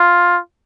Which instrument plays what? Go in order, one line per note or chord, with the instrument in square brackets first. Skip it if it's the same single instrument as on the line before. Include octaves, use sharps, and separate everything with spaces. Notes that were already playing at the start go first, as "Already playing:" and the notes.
Already playing: [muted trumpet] F4